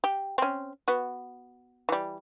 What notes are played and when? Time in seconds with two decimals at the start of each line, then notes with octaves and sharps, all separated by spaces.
0.04 G4
0.38 C4 C#4
0.88 B3 F#4
1.89 E3 G3